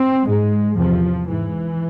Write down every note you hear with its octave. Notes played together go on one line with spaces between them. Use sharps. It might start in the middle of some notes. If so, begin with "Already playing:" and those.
Already playing: C4
G#2 G#3
E2 C3 F3
G#2 E3